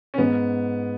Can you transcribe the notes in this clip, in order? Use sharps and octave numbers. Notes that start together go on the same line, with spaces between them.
C#4
G#2 B3